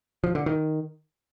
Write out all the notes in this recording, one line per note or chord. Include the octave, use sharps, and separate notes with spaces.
F3
D3
D#3